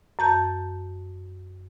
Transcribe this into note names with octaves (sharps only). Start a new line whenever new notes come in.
F#2 A5 G6